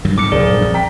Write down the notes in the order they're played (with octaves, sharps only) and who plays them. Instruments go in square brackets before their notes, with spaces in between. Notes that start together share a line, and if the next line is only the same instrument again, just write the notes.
[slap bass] G2 D#3 F#3
[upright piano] F2 [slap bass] G#2 C4 [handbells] D6 C#7
[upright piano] D#1 A#4 C5 [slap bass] C2 F#2 A2 [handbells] G#4 D5
[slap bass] B1 G2
F2
[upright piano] G5 A#5 B6